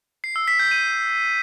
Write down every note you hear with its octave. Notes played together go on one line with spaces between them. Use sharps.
C7
E6
B6
G6
D#7